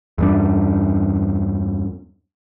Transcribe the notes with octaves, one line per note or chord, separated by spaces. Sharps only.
E2 G2 D4